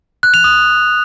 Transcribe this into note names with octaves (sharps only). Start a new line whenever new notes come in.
F#6
F7
D#6